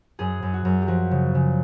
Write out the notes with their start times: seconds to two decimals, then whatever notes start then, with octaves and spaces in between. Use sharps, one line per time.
0.19 F#2 G#4
0.42 F#2
0.53 F#4
0.65 F#2
0.81 G4
0.88 F3 F#4
1.11 C#3
1.35 C#3